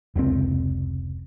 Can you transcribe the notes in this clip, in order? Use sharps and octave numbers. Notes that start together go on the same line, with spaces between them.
F1 C#2 A2 C4